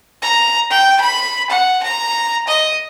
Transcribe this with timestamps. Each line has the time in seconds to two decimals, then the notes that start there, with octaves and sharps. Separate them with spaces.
0.22 A#5
0.70 G5
1.01 B5
1.50 F#5
1.83 A#5
2.48 D#5